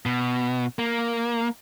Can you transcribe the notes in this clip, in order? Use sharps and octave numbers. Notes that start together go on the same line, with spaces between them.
B2
A#3